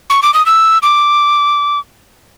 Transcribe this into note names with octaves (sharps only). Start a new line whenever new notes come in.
C#6
D6
D#6
E6
D6